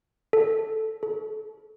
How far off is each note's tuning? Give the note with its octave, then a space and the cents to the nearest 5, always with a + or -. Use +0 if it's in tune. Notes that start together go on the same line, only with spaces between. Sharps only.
A4 -5
A4 -35